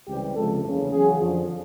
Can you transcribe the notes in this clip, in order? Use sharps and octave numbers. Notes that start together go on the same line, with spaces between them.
C#2 C3 E3 G3 G4
C#2 C3 F3 A4
F#1 E2 C#3
E2 C#3 F#3 G#4
F2 D3 F3